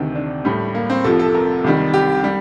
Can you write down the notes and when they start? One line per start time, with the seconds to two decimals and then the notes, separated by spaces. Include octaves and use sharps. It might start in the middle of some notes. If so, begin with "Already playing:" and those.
Already playing: D2 C3 D#3
0.15 D4
0.45 A2 G3
0.75 A#3
0.90 C4
1.04 C2 C3 F3 A4
1.19 A4
1.34 A#4
1.64 C2 C3 D#3 G3
1.94 G4
2.24 G3